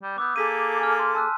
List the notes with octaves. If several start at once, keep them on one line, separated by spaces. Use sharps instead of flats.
G3
B3 D6 E6 G6
A#3 G#4 A4 D6 D#6 B6 D#7
G#5 A5 F6
C6
A5 E6 F#6